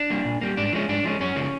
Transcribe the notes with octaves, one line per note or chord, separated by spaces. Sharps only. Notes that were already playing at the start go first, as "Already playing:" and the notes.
Already playing: D4
G3 A#3
A#2
G3 A#3
G#2 D4
F3 G#3 C#4
G#2 D4
F3 G#3 C#4
F#2 C#4
C#3 F3 A#3